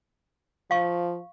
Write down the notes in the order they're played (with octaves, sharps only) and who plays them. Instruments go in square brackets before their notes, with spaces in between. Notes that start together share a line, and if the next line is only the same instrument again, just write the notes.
[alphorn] F3 [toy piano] F5 C#6